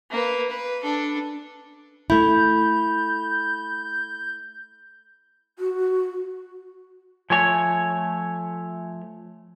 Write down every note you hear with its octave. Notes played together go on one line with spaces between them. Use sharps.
A#3 B4
B4
D4 A4
A3 E4 B5 G6
F#4
F3 A3 C#5 G#5 G#6